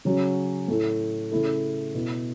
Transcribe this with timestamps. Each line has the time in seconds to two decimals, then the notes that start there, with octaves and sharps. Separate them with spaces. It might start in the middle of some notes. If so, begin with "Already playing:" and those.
0.05 C#3 F#3 C#4 F#4
0.68 A2 A3 E4
1.32 C#3 A3 E4 A4
1.95 B2 B3 E4